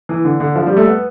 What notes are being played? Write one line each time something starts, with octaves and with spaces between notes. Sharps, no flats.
E3
D3
D3
F3
G3
A3
B3